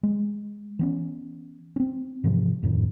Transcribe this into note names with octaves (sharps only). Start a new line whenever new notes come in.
G#3
E3 B3 C#4
C4 C#4
G#2 C3 E3 F3
D1 F2 A2 D#3